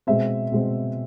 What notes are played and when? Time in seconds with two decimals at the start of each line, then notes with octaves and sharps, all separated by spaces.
0.07 B2 G#3 C4 E5
0.52 B2 G#3 C4